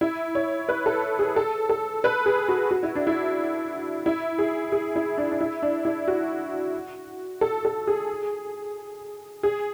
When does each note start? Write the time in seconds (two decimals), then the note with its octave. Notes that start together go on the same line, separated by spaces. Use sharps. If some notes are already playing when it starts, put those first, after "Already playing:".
0.01 E4
0.35 C#5
0.69 B4
0.86 A4
1.19 G#4
1.36 A4
1.69 A4
2.04 B4
2.26 G#4
2.48 F#4
2.71 F#4
2.83 E4
2.96 D4
3.07 E4
4.06 E4
4.38 G#4
4.72 G#4
4.96 E4
5.18 D4
5.31 D4
5.41 E4
5.62 D4
5.85 E4
6.08 F#4
7.41 A4
7.65 A4
7.87 G#4
9.43 G#4